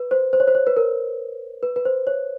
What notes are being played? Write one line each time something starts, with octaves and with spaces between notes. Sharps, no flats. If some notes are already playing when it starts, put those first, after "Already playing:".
Already playing: B4
C5
C5
C#5
C5
C#5
B4
A#4
B4
B4
C5
C#5